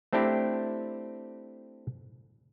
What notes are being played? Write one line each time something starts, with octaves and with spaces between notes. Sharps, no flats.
A3 C4 D4 E4 G4